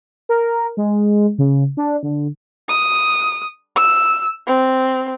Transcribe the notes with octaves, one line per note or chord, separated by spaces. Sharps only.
A#4
G#3
C#3
D4
D3
D#6
E6
C4